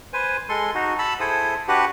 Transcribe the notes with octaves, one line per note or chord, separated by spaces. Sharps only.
B4 C5 G#5
G#3 A4 C6
D#4 F#4
A5 B5 E6
E4 G#4 A4 C5 D#6
D4 F#4 G4 B4 F#5